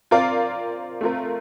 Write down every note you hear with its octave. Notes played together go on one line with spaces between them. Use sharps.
C4 F4 A#4 D5 F5
A3 C4 F4 A#4